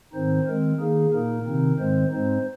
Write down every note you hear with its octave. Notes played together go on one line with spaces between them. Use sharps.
G#2 D#3 C4 D#4 C5
D#3 G#3 C4 A#4
D#3 A#3 D#4 G#4
A#2 A#3 D#4 A#4
C3 D#3 C4 D#4
G#2 D#3 G#3 C4 C5
G#2 G#3 C4 D#4 C5